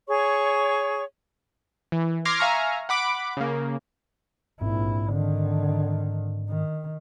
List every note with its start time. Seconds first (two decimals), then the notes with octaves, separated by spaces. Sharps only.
0.08 G#4 C#5 C#6
1.92 E3
2.25 C6 D6 F6 G#6 A#6 C7
2.38 E5 F5 G#5 A#5 C#6 F6
2.89 F#5 B5 D6 D7
3.37 C#3 A#3
4.61 A#1 G#2 C4 E4
5.10 D3 D#3
6.49 D#3